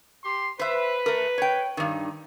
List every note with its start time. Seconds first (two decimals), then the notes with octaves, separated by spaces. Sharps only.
0.24 G4 C6
0.59 B4 C5 E5
1.06 A3 A#4
1.38 C#5 G5
1.77 G2 D#3